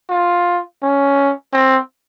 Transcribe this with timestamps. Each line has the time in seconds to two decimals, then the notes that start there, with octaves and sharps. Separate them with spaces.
0.10 F4
0.82 C#4
1.53 C4